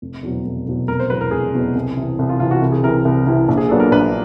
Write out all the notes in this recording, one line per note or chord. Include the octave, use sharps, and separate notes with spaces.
F1
E2 B2 F#3
F1
E2 B2 F#3
F1 A#4
C5
E2 B2 F#3 B4
A#4
F1 G#4
E2 B2 F#3
C2
C3 E3
C2
F4
C3 E3 F4
F#4
C2
G#4
C3 E3 A#4
C2
C3 E3
A#1
G#4
A#2 F#3 B3 D4 A4
A#4
A#1 B4